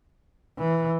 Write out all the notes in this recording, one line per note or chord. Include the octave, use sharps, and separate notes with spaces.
E3